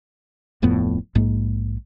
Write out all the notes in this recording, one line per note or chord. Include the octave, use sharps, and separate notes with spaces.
D1 F2 A2 B3
A#1 G#2 G#3 A#3